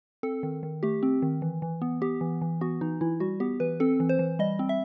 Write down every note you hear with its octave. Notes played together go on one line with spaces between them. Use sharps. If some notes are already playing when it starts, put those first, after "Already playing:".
C4 A4
D#3
D#3
A3 G4
C4
D#3
E3
E3
B3
B3 G4
E3
E3
B3 F#4
E3 D#4
E3 E4
G3 F#4
B3 G4
E3 B4
C4 A4
E3
C5
E3
G3 D#5
C4
E5